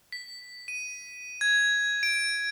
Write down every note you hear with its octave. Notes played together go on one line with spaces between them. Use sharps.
B6
D#7
G#6
D7